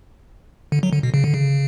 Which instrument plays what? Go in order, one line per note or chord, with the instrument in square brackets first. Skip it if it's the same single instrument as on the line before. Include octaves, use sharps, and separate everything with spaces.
[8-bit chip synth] D3
F#3
D3
B2
C#3
D3
C#3